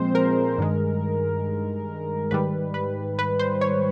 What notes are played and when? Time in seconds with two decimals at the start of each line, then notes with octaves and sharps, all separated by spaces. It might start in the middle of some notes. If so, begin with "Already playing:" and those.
Already playing: A#2 F3 G#3 C4 C5
0.15 A#4
0.58 G2 D#3 G#3
2.31 G#2 D#3 G3 B4
2.74 B4
3.19 B4
3.39 C5
3.61 C#5